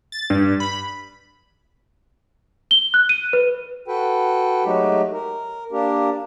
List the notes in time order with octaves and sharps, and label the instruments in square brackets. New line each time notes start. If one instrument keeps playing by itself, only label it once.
[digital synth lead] A6
G2
B5
[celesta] G7
F#6
D#7
B4
[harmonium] F#4 A4 B4 G5
F#3 G#3 A3 D#4 F#4 G4
A#4
A#3 D4 G4 A#4